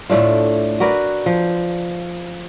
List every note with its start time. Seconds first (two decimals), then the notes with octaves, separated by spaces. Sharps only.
0.10 A2 A3 D4 F4
0.80 F#4 A#4 B4 D5
1.26 F3